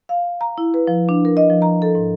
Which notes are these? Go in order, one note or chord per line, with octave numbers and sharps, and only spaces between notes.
F5
A#5
E4
B4
F3
D4
A#4
D#5
F3
A#5
A4
G#2